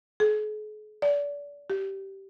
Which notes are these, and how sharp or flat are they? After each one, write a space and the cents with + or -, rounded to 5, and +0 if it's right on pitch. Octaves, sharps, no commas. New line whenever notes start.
G#4 +45
D5 -30
G4 -15